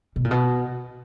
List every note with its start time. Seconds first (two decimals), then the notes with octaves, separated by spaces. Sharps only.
0.16 B2
0.24 A#2
0.31 B2